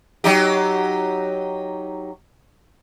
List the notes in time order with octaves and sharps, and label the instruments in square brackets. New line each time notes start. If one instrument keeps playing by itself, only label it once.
[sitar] F#3 D#4 G4